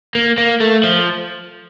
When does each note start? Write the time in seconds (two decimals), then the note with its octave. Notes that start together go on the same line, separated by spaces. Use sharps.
0.15 A#3
0.38 A#3
0.61 A3
0.84 F3